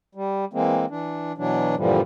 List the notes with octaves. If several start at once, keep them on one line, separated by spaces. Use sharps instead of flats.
G3
E3 G#3 A#3 C4
E3 D4
B2 E3 F#3 D4
G2 A#2 D3 E3 F3 G3